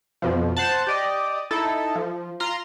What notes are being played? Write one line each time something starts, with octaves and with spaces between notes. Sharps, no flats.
F2 B2 F3
C5 F#5 A5
G4 D5 D#5
D#4 E4 A4
F3
F4 A#5 C6